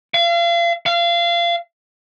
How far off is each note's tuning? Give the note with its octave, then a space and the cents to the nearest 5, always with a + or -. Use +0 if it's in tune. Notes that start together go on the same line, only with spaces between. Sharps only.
F5 -35
F5 -25